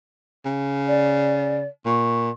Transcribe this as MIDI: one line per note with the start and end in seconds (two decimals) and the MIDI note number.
0.45 1.65 49
0.87 1.66 74
1.86 2.30 46
1.86 2.28 85